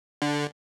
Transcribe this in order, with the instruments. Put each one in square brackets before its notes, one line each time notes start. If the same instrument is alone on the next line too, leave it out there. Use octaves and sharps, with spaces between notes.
[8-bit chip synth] D3